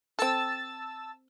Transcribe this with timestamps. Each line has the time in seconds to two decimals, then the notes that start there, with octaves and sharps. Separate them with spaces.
0.19 C4 A4 A5 E6 A6